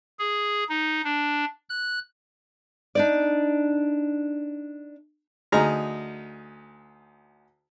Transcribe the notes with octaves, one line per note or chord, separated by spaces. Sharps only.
G#4
D#4
D4
F#6
D4 D#4 D5
D2 D#4 G#4 A#5 F6